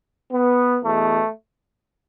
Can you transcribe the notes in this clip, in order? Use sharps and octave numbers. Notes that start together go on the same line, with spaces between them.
B3
E2 B2 A3